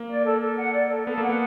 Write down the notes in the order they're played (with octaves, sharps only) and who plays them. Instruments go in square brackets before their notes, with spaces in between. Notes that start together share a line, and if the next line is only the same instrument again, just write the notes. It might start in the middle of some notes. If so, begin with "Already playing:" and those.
Already playing: [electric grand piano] A#3
[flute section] D5
A4
A4
F#5
D5
A4
[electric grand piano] B3 [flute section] A4
[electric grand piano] A#3
[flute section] F#5
[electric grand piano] B3